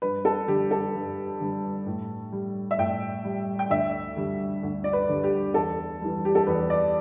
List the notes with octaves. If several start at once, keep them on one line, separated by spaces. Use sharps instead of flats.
G2 B4
A4
D3 G3 G4
A4
G2
D3 G3
A2
G3
E5
A2 G5
G3
G5
D2 E5
D3 G3
D2
D5
B4
D3 G3
G4
E2 A4
E3 G3
G4
A4
E2 B4
D5